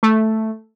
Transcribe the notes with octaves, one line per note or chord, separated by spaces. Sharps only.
A3